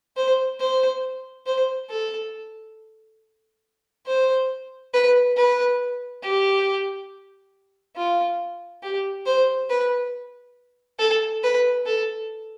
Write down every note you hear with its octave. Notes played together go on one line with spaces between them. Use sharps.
C5
C5
C5
A4
C5
B4
B4
G4
F4
G4
C5
B4
A4
B4
A4